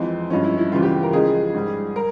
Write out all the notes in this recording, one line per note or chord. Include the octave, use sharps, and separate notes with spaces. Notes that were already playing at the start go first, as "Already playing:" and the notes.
Already playing: F2 E3 G#3 C4
G2 F3 G#3 C#4
E4
E4
E2 C#3 E3 G3 F4
G4
A#4
C#2 C#3 F3 G#3 G#4
G#2 G3
A#4